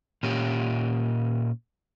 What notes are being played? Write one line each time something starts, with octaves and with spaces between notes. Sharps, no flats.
A#2 C#4 G4